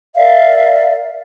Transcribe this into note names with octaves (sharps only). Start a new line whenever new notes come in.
A#4 D5 E5 F5